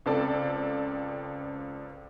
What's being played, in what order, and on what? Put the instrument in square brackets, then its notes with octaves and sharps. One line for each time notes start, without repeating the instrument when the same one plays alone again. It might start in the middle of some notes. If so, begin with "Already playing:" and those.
[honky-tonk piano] C#2 C4 A4 D5